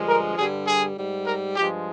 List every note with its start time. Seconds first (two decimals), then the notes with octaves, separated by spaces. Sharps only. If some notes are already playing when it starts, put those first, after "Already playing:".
Already playing: G2 D3 F3 G#3
0.08 A#4
0.38 G2 D3 G3 G#4
0.67 G#4
0.97 G#2 G3
1.27 A#4
1.56 G2 F3 G#3 G4